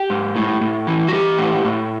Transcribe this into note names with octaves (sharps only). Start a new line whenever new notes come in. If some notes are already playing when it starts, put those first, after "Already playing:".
Already playing: G4
G#2
A2
A2
E3
F#4
E3 G4
A2
A2